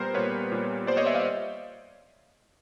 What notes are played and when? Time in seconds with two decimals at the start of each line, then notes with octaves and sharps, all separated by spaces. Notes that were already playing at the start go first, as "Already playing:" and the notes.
Already playing: A#2 G3 B3 A#4 C5
0.14 A#2 G3 B3 B4 C#5
0.52 A#2 G3 B3
0.87 A#2 G3 B3 C5 D5
0.97 C#5 D#5
1.06 D5 E5
1.15 D#5 F5